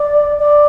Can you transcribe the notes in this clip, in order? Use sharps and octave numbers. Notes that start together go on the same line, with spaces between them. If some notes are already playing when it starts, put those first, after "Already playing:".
Already playing: D5
D5